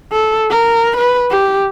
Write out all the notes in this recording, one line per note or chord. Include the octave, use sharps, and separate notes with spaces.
A4
A#4
B4
G4